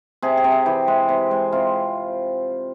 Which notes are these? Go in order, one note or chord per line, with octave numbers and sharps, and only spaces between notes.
C3 G#4
G#4
C3
G#4
E3 G4
G#3
C3
G#3
C3 F4